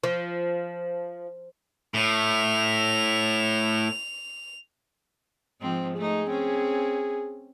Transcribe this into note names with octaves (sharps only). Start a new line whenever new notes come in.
F3
A2 F7
G#2 F3 C4
A3 D#4 G#4
C4 C#4